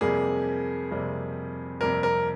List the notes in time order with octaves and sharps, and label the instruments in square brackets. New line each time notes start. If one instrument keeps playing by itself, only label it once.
[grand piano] F2 C3 G3 A#3 [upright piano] G#4
[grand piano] F2 C3 G3 A#3
[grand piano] F2 C3 G3 A#3 [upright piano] A#4
[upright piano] A#4